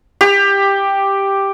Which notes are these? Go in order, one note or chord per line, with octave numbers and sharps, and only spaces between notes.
G4